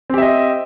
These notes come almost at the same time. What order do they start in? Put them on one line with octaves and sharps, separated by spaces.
C4 G4 E5 D#5